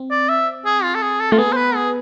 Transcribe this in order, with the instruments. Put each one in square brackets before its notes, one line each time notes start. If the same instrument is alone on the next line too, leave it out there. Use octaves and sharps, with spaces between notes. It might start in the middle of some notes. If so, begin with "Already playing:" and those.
Already playing: [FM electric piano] C4
[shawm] D5
E5
G#4
F4
A4
G#4
A4
[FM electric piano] A3 [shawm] F4
[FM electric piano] B3 [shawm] G#4
[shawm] C5
B4
G#4